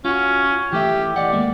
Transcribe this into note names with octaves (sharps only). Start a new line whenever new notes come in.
C#4 F4 F#4
E3 A3 G4 E5
D5 D#5 F#5
D#2 G#3 A#3